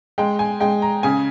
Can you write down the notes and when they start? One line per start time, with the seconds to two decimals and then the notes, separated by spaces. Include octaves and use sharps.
0.18 G#3 G5
0.39 G#5
0.60 G#3 G5
0.82 A#5
1.03 C#3 G#5